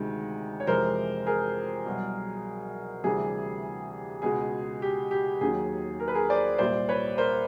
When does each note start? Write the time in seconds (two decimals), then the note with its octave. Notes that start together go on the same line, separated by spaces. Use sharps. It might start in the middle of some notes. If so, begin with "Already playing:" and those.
Already playing: D2 C3 D#3 G#3
0.60 C#5
0.67 F2 C3 E3 G#3 A#4 C5
1.26 G#4 A#4
1.86 C2 B2 F#3
3.04 D2 C3 E3 G3 G#4
4.22 C#2 B2 G#3 G#4
4.82 G4
5.11 G4
5.41 D#2 D#3 F#3 G#4
6.00 A#4
6.08 B4
6.14 G#4 A#4
6.29 C5 D5
6.58 C2 A#2 G3 C5 D5
6.89 B4 C#5
7.18 A#4 C5